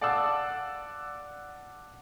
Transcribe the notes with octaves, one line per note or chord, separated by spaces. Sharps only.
D5 F5 F#5 A5 D6 E6